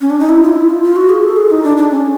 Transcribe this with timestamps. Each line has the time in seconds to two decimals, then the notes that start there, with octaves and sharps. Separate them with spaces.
0.01 C#4
0.10 D4
0.20 D#4
0.29 E4
0.43 F4
0.56 E4
0.69 F4
0.83 F4
0.96 F#4
1.09 G#4
1.23 A4
1.37 G#4
1.50 D#4
1.64 D4
1.77 D4
1.90 C#4